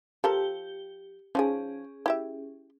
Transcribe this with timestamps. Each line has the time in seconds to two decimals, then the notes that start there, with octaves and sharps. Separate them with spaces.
0.24 F3 G4 A4 A#4 G7
1.35 F3 C#4 D#4 G#4 G#5
2.06 E4 G4 E5